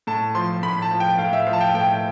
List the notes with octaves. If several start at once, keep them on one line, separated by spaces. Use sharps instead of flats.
A2 A5
F3 C6
A2 B5
A5
F3
G5
A2 F5
E5
F3 F5
A5
G5
A2 G5